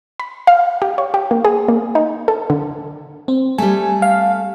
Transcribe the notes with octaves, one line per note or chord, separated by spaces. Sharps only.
B5
F5
G4
C#5
G4
A#3
G#4
A#3
D#4
A4
D3
C4
G3 A3 G#5
F5